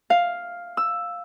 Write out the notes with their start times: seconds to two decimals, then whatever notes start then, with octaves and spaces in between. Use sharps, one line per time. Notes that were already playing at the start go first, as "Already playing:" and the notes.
0.10 F5
0.77 E6